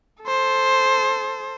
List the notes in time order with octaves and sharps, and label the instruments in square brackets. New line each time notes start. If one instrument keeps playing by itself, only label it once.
[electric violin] A4 C5